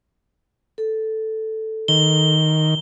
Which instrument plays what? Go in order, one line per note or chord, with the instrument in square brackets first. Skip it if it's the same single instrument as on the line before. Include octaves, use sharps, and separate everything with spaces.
[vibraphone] A4
[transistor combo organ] D#3 [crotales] G7